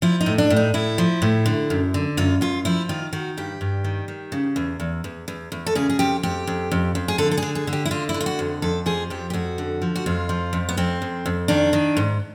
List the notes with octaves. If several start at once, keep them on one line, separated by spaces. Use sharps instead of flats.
F3 E4
D#4
A2
D4
A2
D#4
A2 E4
F3
A2
D3
F#2
D3
F#2 F4
F#2 F4
F3 E4
D#3 F4
D#3 F#4
G2 G4
G2
D#3
D#3
C#3
E2
E2
E2
E2
E2
A4
C#3 G#4
G#4
F2 G4
F2 G4
F2
F2
F2
G#4
D3 A4
A4
G#4
D3
G#4
D3
G4
E4
D3 F4
E4
D3
F4
F#4
F2
F2 A4
F3 G#4
F2 G4
G4
F2 F#4
D3
F3
F#4
F2 F4
F3
F2
B3
F2 C4
F2
F2
D#3 D4
D#3
G#2